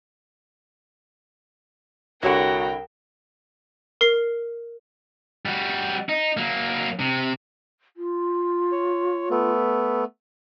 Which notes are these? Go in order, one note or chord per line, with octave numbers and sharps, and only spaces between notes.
C2 D3 E4 F#4 A#4 C#5 G5 E7
A#4 C7
G3 F#4
D#4
F#3 A#3
C3
F4
C#5
A3 B3